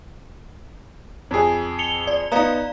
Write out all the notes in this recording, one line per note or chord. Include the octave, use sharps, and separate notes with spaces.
F2 G#4
C#7 F7 G7
D5
B3 D#4 D5 F5 A#5